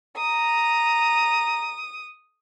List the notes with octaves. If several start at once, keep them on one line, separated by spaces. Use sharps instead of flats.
A#5 D#6